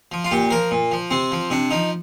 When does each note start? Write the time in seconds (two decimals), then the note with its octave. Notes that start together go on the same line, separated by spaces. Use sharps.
0.12 F3
0.24 F4
0.31 A#2 G4
0.51 F3 A#4
0.71 A#2
0.92 F3
1.11 C3 C4
1.32 F3
1.50 C3 D4
1.71 F3 D#4